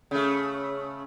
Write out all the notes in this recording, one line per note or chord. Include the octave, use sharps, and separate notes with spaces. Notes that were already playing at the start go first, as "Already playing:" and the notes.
C#3 A3